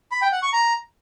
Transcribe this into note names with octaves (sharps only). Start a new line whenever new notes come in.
B5
G5
F#5
C#6
A#5